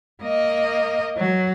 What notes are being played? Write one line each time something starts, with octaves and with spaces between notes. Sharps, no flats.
A#3 D#5
F#3